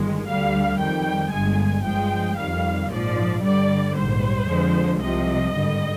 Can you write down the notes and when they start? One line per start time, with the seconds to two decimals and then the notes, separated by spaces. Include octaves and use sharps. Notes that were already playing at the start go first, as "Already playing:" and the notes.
Already playing: G1 G2 D#3 G#3
0.26 D2 D3 G3 F5
0.79 F2 D#3 G3 G5
1.31 G1 G2 D3 G#3 G#5
1.84 G2 F3 G#3 G5
2.37 F2 D#3 G3 F5
2.90 A#1 G#2 F3 D5
3.42 G2 D3 G3 D5
3.96 A#1 G#2 G3 C5
4.48 F2 D3 F3 G#3
5.01 C2 C3 F3 D#5
5.54 G#1 G2 D3 G3